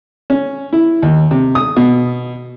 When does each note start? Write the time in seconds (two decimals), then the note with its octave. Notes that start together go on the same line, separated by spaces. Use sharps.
0.30 C#4
0.73 E4
1.03 D#2
1.31 C3
1.55 D#6
1.76 B2